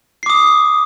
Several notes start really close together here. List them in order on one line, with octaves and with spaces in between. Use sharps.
C7 D6 D#6